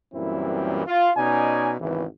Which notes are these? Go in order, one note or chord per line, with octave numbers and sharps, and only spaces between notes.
F#2 A#2 E3 G3 C4 E4
F4
B2 C#4 D#4 D5 G#5
G#1 E2 C#3 E3